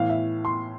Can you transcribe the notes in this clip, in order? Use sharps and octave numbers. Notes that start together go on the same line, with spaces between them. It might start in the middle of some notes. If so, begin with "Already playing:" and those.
Already playing: A2 E3 F5
E5
C6